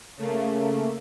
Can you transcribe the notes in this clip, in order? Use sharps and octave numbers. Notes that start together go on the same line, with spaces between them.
C#3 A3 A#3